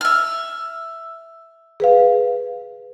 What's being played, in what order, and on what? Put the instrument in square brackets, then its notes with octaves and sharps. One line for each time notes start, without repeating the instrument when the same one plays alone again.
[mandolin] E5 F6
[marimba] G#4 B4 F5